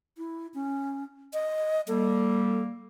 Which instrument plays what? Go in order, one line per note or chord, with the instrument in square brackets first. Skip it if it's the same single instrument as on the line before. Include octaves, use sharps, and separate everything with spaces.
[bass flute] E4
C#4
D#5
[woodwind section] G3 A#3 [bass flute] A4